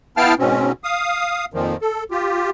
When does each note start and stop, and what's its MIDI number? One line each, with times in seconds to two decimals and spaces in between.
0.17 0.34 59
0.17 0.34 64
0.17 0.34 77
0.17 0.34 79
0.17 0.34 81
0.17 0.34 89
0.39 0.72 44
0.39 0.72 47
0.39 0.72 60
0.39 0.72 61
0.84 1.45 77
0.84 1.45 87
1.54 1.77 41
1.54 1.77 46
1.54 1.77 51
1.54 1.77 53
1.81 2.04 69
2.11 2.50 65
2.11 2.50 67